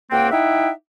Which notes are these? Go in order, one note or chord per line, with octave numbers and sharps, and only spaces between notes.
C#2 A#3 C4 F#5 G5
D#4 E4 E5 F#5 G5